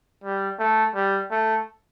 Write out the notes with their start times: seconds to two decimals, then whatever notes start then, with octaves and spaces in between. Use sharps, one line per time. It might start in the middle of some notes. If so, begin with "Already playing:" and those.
0.24 G3
0.59 A3
0.95 G3
1.31 A3